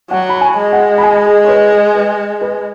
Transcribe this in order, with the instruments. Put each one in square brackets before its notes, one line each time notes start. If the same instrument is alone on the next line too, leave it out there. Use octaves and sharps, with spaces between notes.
[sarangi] F#3 [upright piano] F#5
[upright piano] B5
G#5
[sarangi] G#3
[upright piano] F#5
B5
G#5
G#4
C#5
B4
G#4
B4
B4